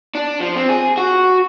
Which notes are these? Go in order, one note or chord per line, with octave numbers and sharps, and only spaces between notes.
D4
F3
C4
G#4
F#4